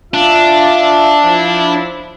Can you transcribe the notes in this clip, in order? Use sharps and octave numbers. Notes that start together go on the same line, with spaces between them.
D4 F4 E5
F3 E4